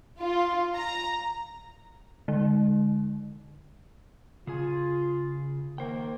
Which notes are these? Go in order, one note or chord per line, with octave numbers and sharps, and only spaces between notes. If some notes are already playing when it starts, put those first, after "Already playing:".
F4
A#5
D3 G#3
C#3 F4 G#4 G#5
D#3 A#3 A#4 C5 G5